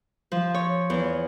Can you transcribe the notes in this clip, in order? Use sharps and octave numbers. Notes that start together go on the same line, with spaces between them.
F3
C#5
E2